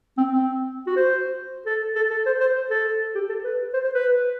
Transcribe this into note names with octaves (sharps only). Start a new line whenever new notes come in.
C4
C4
F#4
C5
A4
A4
A4
C5
C5
A4
G4
A4
B4
C5
C5
B4